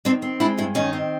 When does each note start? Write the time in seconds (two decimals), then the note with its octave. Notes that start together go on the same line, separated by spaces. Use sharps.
0.05 D#3 C4 D4
0.22 C4
0.40 G#3 D4 E4
0.58 G2 D4 E4
0.75 D#3 C#4 D#4
0.93 C4